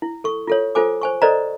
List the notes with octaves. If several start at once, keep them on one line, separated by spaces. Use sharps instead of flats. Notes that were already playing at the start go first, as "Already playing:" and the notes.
E4
A4 C#6
F4 A4 C#5
F4 A4 C5 G#5 D6
C5 G#5 C#6
A4 B4 C5 D5 D#5 A#5